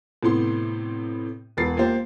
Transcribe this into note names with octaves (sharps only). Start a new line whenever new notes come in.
A2 C3 B3 C6
E1 B3 B4 A6 C7
A#3 F4 G4 C5